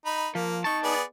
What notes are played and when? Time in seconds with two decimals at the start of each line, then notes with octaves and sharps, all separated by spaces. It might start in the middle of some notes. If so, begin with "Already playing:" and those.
0.06 D#4 B5
0.35 F3 A#3
0.64 D#4 A5 C#6
0.83 B3 G#4 D5